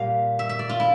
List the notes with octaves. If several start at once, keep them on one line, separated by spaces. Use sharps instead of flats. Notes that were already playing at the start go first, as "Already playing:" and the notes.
Already playing: A#2 G3 A#3 F5
E5
E5
D5
F4
E4